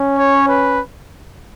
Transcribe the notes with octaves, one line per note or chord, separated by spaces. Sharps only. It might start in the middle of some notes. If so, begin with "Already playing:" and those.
Already playing: C#4
C#5
B4